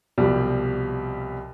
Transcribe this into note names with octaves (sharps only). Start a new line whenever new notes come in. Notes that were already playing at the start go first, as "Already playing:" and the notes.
C2 B2 F3 G3